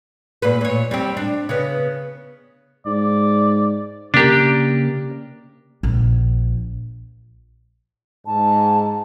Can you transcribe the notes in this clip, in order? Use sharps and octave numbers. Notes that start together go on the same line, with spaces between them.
A#2 B4
A#2 C#5
G3 C4
D4
C#3 B3
G#2 D5
C#3 A#3 D4 G4 A#4
A#1
G#2 A5